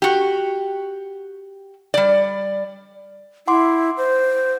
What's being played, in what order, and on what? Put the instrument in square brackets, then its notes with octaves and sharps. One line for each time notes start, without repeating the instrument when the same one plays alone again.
[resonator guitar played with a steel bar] F#4 G4
G3 D5
[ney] E4 [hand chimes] F#5 C6 D6
[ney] C5